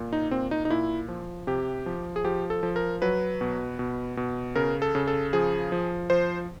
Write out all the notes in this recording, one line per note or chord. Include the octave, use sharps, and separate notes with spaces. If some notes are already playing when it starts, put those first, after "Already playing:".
Already playing: A#2
D#4
A#2 C4
D#4
D#4
A#2 E4
F3
C3 G4
F3
G#4
F3 G4
A4
F3
A#4
F#3 B4
B2
B2
B2
C#3 A#4
A4
C#3
A4
F3 G#4
F3
F3 C5